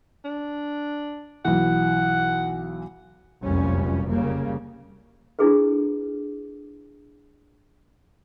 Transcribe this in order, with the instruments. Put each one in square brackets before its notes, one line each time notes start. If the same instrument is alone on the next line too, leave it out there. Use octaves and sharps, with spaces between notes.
[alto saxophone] D4
[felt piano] B1 E3 [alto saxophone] F#5
[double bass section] F1 C2 F#2 A#2 G3 C#4
C#3 G3 A#3
[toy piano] D4 E4 F4 G#4 A4 B4